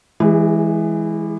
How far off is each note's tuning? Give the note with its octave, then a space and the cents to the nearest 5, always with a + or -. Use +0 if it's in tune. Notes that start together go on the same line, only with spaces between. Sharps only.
E3 +0 G#3 +5 G#4 -45